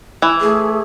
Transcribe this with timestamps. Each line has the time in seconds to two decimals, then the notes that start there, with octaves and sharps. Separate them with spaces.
0.22 E3
0.41 A3 G#4